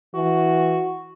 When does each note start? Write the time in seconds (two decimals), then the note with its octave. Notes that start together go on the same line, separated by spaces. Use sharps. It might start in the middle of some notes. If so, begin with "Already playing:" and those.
0.15 E3 F#4